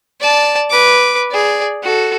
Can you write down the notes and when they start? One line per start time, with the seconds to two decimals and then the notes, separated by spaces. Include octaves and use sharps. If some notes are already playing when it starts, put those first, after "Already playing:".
0.20 D5 A5
0.71 B4 D6
1.31 G#4 D5
1.83 F#4 A4